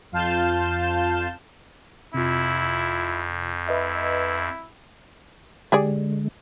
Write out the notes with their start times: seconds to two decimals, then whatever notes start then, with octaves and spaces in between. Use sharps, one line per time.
0.12 F2 F4 F5 A5 G6 E7
2.14 F2 C3 E4 F4
3.68 E4 B4 D#5 E5
5.72 D3 G#3 G4 G#4 D5